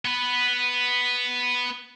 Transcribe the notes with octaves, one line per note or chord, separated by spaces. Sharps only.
B3 B4